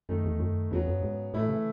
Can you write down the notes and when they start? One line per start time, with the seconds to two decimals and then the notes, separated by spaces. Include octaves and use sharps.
0.09 F#2 D#3 A3 D#4
0.25 E2
0.40 F#2
0.71 E2 C#3 F#3 B3
0.87 F#2
1.03 G#2
1.34 A2 E3 A3 E4
1.49 C#3